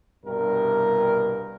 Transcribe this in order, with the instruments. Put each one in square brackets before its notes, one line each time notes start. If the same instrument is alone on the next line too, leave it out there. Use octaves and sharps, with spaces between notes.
[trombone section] C2 G2 B2 A#4